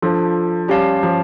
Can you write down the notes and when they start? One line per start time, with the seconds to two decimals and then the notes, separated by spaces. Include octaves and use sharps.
0.02 F3 D4 F4 A4
0.68 G3 C#4 G4 C#5 F5 A5
1.03 F3